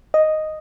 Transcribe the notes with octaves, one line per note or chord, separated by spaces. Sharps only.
D#5